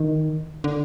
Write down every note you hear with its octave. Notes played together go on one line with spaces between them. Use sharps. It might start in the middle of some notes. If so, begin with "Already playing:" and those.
Already playing: D#3
D3